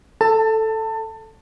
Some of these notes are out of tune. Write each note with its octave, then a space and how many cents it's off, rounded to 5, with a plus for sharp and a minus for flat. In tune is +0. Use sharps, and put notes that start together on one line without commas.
A4 +0 A5 +25